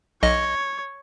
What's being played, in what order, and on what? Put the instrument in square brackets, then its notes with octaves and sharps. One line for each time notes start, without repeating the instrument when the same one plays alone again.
[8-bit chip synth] B1 D#5 [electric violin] C#5